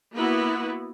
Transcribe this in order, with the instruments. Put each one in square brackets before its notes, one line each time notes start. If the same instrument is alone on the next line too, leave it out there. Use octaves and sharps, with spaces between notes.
[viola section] A#3 B3 E4 F#4 B4